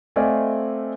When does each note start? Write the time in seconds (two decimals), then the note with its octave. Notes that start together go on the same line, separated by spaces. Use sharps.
0.16 A3 C4 D5 D#5 F5 G#5